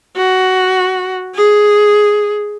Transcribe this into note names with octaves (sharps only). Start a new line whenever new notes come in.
F#4
G#4